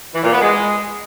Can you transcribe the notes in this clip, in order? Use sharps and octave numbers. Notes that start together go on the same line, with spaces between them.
E3
A#2
B3
G#3